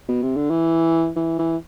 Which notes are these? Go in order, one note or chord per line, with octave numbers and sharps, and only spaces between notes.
B2
C3
D3
E3
E3
E3